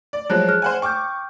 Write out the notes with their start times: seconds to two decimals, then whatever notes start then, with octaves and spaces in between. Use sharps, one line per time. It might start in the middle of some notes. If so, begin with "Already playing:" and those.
0.13 D5
0.30 F3 F#3 G#3 C5 C#5 F#6
0.48 G#4 F6 F#6
0.62 C5 F#5 G#5
0.82 G5 C#6 D6 F6 G6